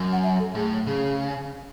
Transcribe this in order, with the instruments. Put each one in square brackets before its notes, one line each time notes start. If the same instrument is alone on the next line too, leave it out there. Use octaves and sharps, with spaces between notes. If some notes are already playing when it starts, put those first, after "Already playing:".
Already playing: [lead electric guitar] F#2
[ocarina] F#5
E5
A4
[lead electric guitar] A2 [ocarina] G#4
[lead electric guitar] C#3 [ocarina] G#4